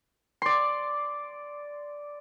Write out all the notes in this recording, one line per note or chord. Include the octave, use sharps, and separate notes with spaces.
D5 C6